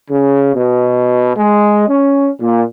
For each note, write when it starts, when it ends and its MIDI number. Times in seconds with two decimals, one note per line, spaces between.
0.11 0.52 49
0.55 1.32 47
1.37 1.86 56
1.89 2.31 61
2.41 2.63 46